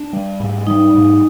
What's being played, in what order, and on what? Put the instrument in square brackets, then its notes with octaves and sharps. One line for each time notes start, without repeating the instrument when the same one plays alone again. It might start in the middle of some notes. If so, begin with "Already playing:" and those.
Already playing: [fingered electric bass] D4
G3
G#2
[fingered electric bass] G3 [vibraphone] D#4
[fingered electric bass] G#2